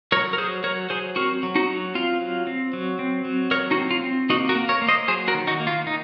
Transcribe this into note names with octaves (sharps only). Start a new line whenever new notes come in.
F#3 A#4 C#5
A#4
F#3 G#4 C5
F#3 A#4 C#5
F#3 G#4 C5
C4 F#4 A#4
F#3
D#4 F#4
F#3
C4 F4
F#3
C4
F#3
C4
F#3
F#3 A#4 C#5
D#4 F#4
C4
F4
C4
A#3 D#4 F#4
F#4 A#4
A#3
A#4 C#5
A#3
C5 D#5
F#3 G#4 C5
F#4 A#4
D#3
D#4 F#4
A#3
F4
D#3 D#4